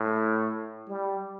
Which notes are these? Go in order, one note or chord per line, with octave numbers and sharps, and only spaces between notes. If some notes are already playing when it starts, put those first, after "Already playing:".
Already playing: A2
G3